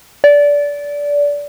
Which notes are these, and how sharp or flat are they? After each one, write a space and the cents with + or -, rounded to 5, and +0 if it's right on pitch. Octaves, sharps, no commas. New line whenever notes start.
D5 -20